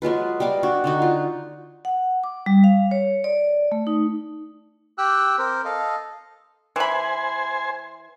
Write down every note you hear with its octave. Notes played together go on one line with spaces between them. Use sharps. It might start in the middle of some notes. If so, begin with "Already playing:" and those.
F#3 G#3 F4 B4
G3 D#5 F5 D6
D4 F#4
D3 D#4 F#4
F4
F#5
D6
G3
F5
C#5
D5
A3
D#4
G4 G5 E6 F#6
C4 A#4 C5
A4 D#5 F5
E3 C5 G#5 B5